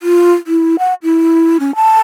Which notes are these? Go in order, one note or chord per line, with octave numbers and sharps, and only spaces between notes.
F4
E4
F#5
E4
C#4
A5